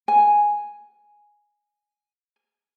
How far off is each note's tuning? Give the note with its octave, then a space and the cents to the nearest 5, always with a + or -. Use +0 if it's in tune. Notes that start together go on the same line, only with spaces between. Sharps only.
G#5 +0